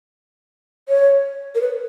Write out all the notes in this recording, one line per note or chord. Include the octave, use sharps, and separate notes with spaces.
C#5
A#4
B4